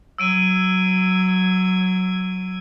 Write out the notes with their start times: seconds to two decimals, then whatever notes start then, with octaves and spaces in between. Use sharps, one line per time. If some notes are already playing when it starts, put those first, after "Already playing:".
0.18 F#3 E6 G#6 D7 D#7